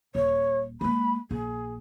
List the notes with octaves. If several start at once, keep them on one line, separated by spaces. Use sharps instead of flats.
D#1 C#5
G#3 A#3 B5
A#1 G#4